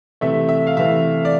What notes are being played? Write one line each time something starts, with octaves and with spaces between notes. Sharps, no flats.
C3 E3 A3 E5
E5
F5
C3 E3 A3 E5
D5